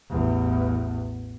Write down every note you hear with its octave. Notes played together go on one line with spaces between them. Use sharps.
A1 E2